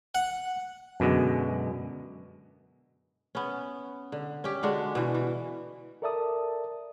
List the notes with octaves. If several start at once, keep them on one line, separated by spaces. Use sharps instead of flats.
F#5
F#2 B2 D3 G#3
B3 C#4
D3
C#4 G4
D3 G#3 D4 F#4
B2 E3
E3
A4 A#4 D5 E5 A5 D#6